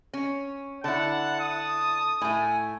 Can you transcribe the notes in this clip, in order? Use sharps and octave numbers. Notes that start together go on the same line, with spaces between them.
C#4
D3 E4 F#5 A5
D#6
A2 A3 G#5